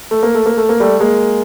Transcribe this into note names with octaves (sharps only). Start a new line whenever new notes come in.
A3
A#3
A3
A#3
A3
A#3
G3 A3
G#3 A#3